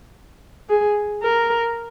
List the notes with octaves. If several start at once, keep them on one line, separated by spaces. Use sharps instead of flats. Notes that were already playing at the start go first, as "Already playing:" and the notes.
G#4
A#4